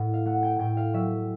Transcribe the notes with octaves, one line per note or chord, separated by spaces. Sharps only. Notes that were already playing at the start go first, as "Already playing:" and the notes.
Already playing: A2 F#5
F5
A3 F#5
G5
A2 G5
F5
F#3 E5